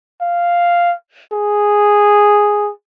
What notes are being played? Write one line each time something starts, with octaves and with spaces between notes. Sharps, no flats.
F5
G#4